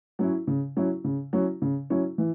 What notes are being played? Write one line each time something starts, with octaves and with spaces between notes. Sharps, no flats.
F#3 C#4 E4
C#3
F#3 C#4 E4
C#3
F#3 C#4 E4
C#3
F#3 C#4 E4
E3